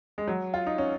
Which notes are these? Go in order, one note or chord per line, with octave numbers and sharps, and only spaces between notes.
G#3
F#3
F4
D#4
C#4